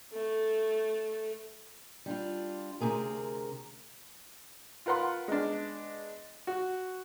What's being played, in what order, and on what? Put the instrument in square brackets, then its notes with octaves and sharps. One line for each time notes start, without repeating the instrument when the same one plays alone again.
[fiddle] A3
[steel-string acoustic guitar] G3 D4 F4
D2 G2 C3 G#4 A#4
[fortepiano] F4 A#4 B4 F#5 C6
G#3 B3 D4
F#4